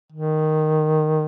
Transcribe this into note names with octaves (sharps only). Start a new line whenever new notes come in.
D#3